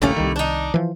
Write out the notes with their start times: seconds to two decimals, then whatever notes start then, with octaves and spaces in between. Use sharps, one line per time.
0.02 A1 D2 G3 A3 A#3 C#4
0.17 C2 D#3
0.36 D4 D#4
0.74 E3 F3